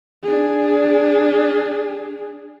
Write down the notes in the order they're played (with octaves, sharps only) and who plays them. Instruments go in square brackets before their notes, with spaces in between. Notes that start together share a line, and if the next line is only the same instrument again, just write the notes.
[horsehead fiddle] D4 G#4